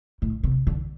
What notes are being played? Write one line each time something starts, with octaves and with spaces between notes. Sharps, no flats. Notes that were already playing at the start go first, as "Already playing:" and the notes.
A2
C3
D3